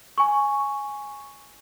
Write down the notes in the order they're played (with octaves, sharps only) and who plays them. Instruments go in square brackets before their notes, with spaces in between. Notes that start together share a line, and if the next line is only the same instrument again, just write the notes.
[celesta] G#5 C#6